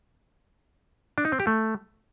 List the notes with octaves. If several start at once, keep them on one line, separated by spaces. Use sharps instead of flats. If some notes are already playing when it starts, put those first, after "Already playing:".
D4
D#4
C4
G4
A3